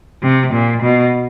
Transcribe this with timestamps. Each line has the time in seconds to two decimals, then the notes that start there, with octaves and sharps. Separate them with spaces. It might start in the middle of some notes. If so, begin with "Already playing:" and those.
0.22 C3
0.53 A#2
0.83 B2